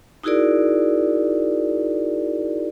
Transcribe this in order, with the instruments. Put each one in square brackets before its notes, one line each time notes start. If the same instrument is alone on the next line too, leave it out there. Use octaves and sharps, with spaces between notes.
[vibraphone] D#4 E4 F#4 G#4 A#4 D5